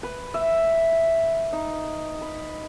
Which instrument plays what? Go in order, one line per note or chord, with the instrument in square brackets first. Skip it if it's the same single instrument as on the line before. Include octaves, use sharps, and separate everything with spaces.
[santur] B4
E5
D#4
B5